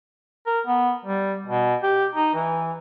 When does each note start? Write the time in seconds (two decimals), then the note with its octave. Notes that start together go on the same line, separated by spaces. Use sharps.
0.46 A#4
0.66 B3
1.05 G3
1.47 B2
1.83 G4
2.15 D#4
2.34 E3